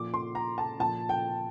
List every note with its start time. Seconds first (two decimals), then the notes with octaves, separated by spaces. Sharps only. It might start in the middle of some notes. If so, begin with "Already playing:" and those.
Already playing: A#2 F3 D6
0.14 C6
0.35 A#5
0.58 A5
0.79 A#2 F3 A5
1.09 G5